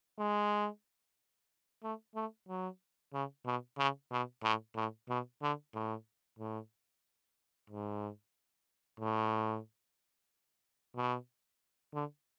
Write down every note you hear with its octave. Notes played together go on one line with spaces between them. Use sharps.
G#3
A3
A3
F#3
C#3
B2
C#3
B2
A2
A2
B2
D3
A2
A2
G#2
A2
B2
D3